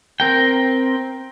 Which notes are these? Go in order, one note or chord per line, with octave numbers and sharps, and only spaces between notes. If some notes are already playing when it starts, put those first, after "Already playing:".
C4 A#4 G5